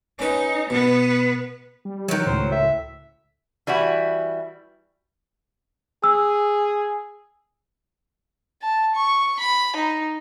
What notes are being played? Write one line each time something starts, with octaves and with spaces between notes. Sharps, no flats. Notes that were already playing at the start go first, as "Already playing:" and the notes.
C#4 D#4 B4
B2 B3 B4
G3
D#3 F3 F#3 D#4
C#2 A2 C#3 C5
E5
E3 G3 E4 F#4
G#4 E6
A5
C#6
B5
D#4